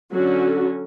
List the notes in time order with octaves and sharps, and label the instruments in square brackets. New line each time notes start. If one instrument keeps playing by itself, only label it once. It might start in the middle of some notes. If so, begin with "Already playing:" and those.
[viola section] D3 F#3 C#4 F#4 A4